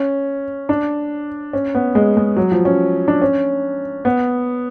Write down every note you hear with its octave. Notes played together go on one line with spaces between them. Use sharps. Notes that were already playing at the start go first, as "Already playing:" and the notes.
Already playing: C#4
D4
C#4
B3
G#3
G#3
F#3
F3
C#4
D4
C#4
B3